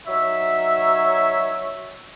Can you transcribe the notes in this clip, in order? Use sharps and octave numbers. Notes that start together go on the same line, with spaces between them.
F#3 D#4 C#5 E5